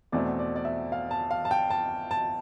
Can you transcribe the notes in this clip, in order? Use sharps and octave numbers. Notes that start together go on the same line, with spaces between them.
E2 B2 A3 C4 D5
D5
D5
E5
F5
A5
F5
A5
G5
A5
A5